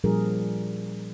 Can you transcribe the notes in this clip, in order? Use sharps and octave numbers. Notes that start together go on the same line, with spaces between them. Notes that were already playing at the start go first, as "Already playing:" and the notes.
A#2 F3 G3 D4 G#4 A#4